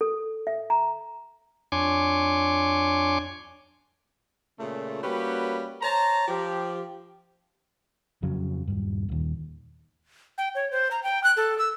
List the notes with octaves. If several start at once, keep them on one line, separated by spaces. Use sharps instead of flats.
A4
E5
A#5
F2 D4 C#5 G#5 C6 D6
A#2 C#3 A3
G3 A#3 C#4 F#4 G4 B4
C5 C#5 A5 A#5
F3 G4
F2 C#3 F#3
D#1 G2
D#1 D#2
G5
C#5
C5
A#5
G5
F#6
A4
E6